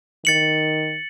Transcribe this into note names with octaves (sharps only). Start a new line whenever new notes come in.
D#3 A6 C#7 F#7